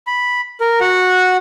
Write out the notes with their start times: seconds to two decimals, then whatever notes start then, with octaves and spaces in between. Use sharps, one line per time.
0.07 B5
0.61 A#4
0.81 F#4 F#5